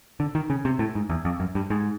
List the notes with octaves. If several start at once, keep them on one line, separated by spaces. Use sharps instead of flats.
D3
D#3
C#3
C3
A2
G#2
E2
F2
F#2
G2
G#2